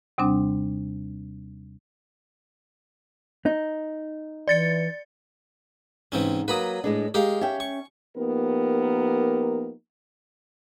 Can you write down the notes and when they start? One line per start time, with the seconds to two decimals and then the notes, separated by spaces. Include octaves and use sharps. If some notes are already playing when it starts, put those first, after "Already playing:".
0.18 D#2 C3 G3 C4 D4
3.46 D#4
4.48 E3 D5 A6 C#7
6.12 G#2 C3 E3 C4 C#4
6.48 F#3 A#3 B4 B5 D#6
6.84 A2 G#3 D4
7.14 G#3 G4 A#4 F5
7.41 C#4 E5 G5
7.60 C#6
8.16 F3 A#3 B3 D#4 G4 A#4